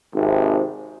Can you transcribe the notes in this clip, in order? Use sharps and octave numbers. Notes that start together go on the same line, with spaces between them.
G#1 C3